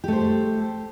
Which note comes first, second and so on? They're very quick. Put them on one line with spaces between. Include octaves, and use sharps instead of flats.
G4 A3 C5